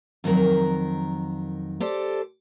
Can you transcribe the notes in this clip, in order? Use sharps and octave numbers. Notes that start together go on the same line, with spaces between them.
F2 D#3 F#3 A#4
G4 A4 C5 D5